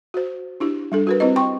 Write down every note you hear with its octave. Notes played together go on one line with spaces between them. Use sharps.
F#4 C5
D4 E4 G4
G3 D4 A4
F#4 A#4 B4
C4 E4 G4 B4 C5 D#5
G5 C6 C#6